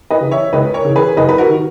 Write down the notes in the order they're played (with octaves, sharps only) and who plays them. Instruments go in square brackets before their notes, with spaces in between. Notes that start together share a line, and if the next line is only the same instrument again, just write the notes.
[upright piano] B4 D#5
C#3 E3
C#5 E5
C#2 B4 D#5
A#4 C#5
C#3 E3
G#4 B4
F#1 B4 D#5
B4
F#4 A#4
D#3